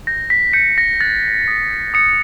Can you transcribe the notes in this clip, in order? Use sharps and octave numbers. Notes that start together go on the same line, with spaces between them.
G6 A#6
B6
G6 C#7
A#6
F#6 A6
D#6
D#6 C#7